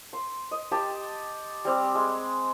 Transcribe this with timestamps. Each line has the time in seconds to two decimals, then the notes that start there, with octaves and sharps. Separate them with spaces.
0.13 C6
0.51 D#5
0.71 G4 G5 A5
1.65 G3 C4 G4
1.95 G#3